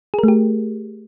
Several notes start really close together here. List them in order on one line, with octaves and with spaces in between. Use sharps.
G#4 A#4 A3 G4